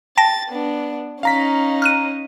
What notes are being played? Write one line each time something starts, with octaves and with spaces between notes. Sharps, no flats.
G5 A5 A6 A#6
B3 D4
C#4 D#4 F5 A#5 B6
F6 F#6 D#7